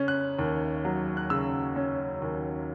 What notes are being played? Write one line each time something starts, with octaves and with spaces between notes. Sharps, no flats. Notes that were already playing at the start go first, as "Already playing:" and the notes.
Already playing: C#3 C#4
F#6
D#2
F#3
F#6
C#3 E6
C#4
D#2